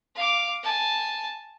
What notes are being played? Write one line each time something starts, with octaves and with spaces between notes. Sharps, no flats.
F5 D6
G#5 A5